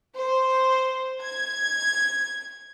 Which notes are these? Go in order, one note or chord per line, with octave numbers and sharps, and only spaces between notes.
C5
G#6